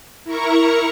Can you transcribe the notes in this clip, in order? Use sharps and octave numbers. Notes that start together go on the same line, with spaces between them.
E4 A#4 A#5 C#6